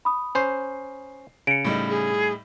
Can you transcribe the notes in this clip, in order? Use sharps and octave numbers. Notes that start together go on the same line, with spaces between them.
B5 D#6
C#4 C5 C7
C#3 C#7 D7
A2 G3 D#4
G#4